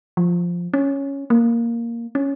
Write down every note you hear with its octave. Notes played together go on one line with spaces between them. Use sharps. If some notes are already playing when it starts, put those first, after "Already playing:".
F3
C#4
A#3
C#4